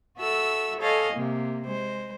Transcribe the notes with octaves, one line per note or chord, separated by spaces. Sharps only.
F#4 A4 E5 E6
A4 C#5 D#5 F5 G#5
C3 A#3
G#3 C5